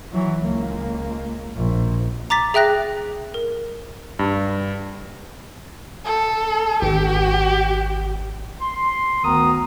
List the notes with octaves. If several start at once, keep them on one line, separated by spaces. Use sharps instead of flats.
E3 F#3
C#2 A#3
A#1
A#5 D6 A6 B6
G#4 E5 G5 F#6 A#6
A#4
G2
A4
G#1 G4
C6
D2 D#3 B3 A#5 D#6